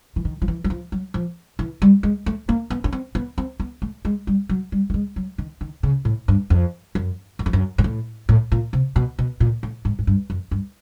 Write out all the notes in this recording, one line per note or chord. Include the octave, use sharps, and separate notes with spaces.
E3
D#3
F3
E3
F#3
F3
F#3
F3
E3
G3
G#3
A3
A#3
B3
C#4
C4
B3
C4
B3
A3
G#3
G3
F#3
G3
A3
G#3
F#3
D#3
D#3
C#3
A2
G2
F2
F#2
F#2
F2
F#2
G#2
A2
A2
A#2
C3
B2
B2
A#2
A2
G#2
G#2
G2
F#2
G2